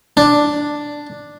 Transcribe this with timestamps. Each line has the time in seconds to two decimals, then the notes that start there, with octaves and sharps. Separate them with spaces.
0.17 D4